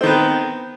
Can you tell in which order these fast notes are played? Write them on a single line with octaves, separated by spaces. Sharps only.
C4 D#3 B3